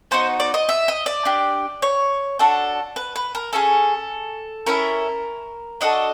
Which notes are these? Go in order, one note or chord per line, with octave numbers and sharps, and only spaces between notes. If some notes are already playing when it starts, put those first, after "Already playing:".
B3 D#4 F#4 C5
D5
D#5
E5
D#5
D5
D4 G4
C#5
D4 F#4 A4
B4
B4
A#4
C#4 F4 G#4 A4
C#4 E4 A4 A#4
D4 F#4 A4 D#5